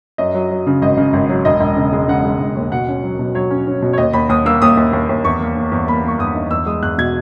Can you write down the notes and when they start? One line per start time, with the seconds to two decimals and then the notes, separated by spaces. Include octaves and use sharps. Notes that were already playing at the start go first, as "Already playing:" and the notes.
0.18 F#2 D#5
0.34 F#3
0.51 F#3
0.67 C#3
0.82 G#1 D#5
0.97 C#3
1.13 G#1
1.29 F#3
1.45 E1 D#5
1.61 E1
1.77 C#3
1.93 G#3
2.08 C#3 F#5
2.24 G#3
2.40 E1
2.56 D#2
2.72 B2 F#5
2.88 C#4
3.03 F#3
3.19 B2
3.34 F#3 C#5
3.50 C#4
3.67 C#4
3.82 B2
3.93 C#5
3.98 D#2 D#5
4.13 D#2 B5
4.29 D#2 D#6
4.46 A#3 E6
4.62 D#2 D#6
4.77 D#2
4.93 D#2
5.09 D#2
5.25 E2 C#6
5.41 A#3
5.56 A#3
5.72 E2
5.88 A#3 B5
6.03 A#3 C#6
6.19 E2 D#6
6.35 D#4
6.50 E2 E6
6.66 G#3 D#6
6.82 E2 F#6
6.98 B2 G#6